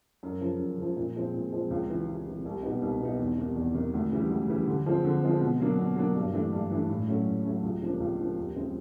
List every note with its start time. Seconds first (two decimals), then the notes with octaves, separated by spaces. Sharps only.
0.23 F#2
0.41 C#3 F3
0.59 F#2
0.78 C#3 F3
0.97 A#2
1.16 F3 G#3 C4
1.34 A#2
1.52 F3 G#3 C4
1.70 C#2
1.89 C3 E3
2.08 C#2
2.27 C3 E3
2.45 C2
2.63 B2 G3 B3 D#4
2.82 C2
3.00 B2 G3 B3 D#4
3.19 E2
3.37 C3 D#3
3.56 E2
3.74 C3 D#3
3.93 D2
4.11 C#3 E3 G3
4.30 D2
4.48 C#3 E3 G3
4.67 D3
4.86 F3 G#3 C4
5.04 D3
5.23 F3 G#3 C4
5.41 B2
5.60 F#3 A#3 D4
5.78 B2
5.96 F#3 A#3 D4
6.15 G2
6.33 E3 A3 D4
6.53 G2
6.71 E3 A3 D4
6.89 A2
7.08 F#3 A3 C#4
7.26 A2
7.45 F#3 A3 C#4
7.63 C#2
7.82 C3 F3 A#3 D4
8.00 C#2
8.19 C3 F3 A#3 D4
8.38 D#2
8.56 C#3 F3 G#3 C4